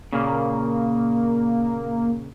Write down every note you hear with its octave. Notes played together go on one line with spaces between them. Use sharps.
A#2 C#3 A#3